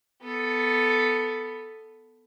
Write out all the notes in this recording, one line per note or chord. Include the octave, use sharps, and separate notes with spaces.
B3 A4